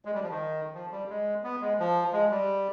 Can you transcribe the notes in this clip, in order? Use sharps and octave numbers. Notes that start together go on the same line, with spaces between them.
G#3
G3
F3
D#3
F3
G3
G#3
B3
G#3
F3
G#3
G3